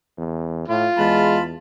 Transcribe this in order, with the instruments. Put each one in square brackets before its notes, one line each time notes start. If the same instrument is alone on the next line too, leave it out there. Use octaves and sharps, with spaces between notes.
[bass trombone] E2
[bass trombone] A2 [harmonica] F4
[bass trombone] E2 [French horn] G#3 [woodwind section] A5 B5